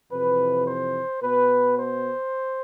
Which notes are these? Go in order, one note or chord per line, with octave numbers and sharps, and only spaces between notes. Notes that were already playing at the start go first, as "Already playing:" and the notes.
F2 C3 E3 B4
C5
B2 B3 B4
C5